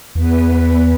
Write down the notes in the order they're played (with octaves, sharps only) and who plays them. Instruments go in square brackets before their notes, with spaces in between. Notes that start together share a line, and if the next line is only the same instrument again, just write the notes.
[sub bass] E2 [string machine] B3 B4